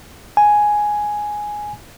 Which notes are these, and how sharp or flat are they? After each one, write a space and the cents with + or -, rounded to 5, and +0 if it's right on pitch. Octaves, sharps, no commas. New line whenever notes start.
G#5 +5